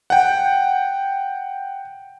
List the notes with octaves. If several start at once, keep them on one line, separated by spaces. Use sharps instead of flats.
F#5 G5